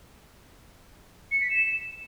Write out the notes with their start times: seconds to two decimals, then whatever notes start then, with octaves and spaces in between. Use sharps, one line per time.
1.31 C#7
1.41 B6
1.50 E7